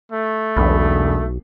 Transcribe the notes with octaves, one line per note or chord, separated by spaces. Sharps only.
A3
E1 B1 B5